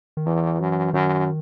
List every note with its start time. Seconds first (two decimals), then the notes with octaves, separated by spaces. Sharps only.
0.17 D#3
0.26 E2 E3
0.60 F#2
0.93 F#2 D#3